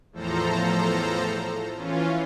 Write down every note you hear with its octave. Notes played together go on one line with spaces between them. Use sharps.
E2 A2 F3 A4 C5 A#5
E3 C#4 F4